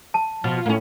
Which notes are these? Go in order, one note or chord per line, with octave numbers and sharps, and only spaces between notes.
A5
B2 F3 F4
A2 A#3 C#4